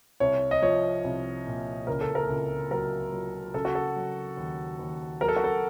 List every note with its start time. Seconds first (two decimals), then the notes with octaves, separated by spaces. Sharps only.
0.20 C2 C#5
0.51 D#5
0.62 F3 C#5
1.04 C2
1.46 A#2
1.87 C#2 A#4
2.01 A4
2.15 A#4
2.30 C#2
2.71 F#3 A#4
3.12 F#3
3.54 C#3 A4
3.65 F#4
3.75 A4
3.96 F#3
4.37 D#2
4.79 D#2
5.21 F#3 A#4
5.28 A4
5.36 F#4
5.44 A4